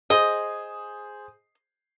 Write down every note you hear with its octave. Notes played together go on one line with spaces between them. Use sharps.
G#4 C5 D#5